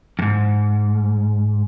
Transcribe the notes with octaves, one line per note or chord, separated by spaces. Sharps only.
F2 G#2